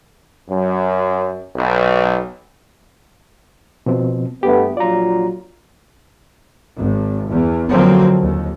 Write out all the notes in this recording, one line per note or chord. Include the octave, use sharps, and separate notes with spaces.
F#2
B1
B2 F3 C4
G2 A3 B3 G4
A#1 F#3 F4 D5 A#5
G#1
E2
F2 D3 F3 F#3 A#3 C4
D#2